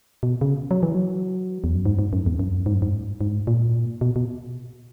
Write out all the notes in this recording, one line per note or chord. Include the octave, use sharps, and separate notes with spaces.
B2
C#3
F#3
E3
F#3
E2
F#2
G#2
G#2
F#2
E2
F#2
G#2
F#2
G#2
G#2
A#2
B2
B2